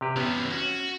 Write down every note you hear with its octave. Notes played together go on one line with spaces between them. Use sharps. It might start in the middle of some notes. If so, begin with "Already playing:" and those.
C3 G4 B4
C3 E3 B3 C#4
C#4 F#4